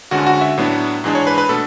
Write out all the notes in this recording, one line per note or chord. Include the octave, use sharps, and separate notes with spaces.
D2 D3 G#3 C#4 F#4
F#4
E5
A2 F#3 B3 D4
G#2 E3 G#3 D4
C#5
B4
B4
B2 A3 D4 A4